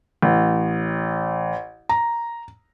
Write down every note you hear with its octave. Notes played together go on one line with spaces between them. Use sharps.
A1
A#5